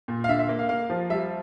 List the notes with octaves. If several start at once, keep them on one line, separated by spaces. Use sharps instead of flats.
A#2
F5
D3 E5
E5
A#3
F5
A#3 F5
F3
G3 E5